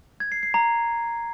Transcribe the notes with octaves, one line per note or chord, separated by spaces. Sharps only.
G#6
C7
C7
A#5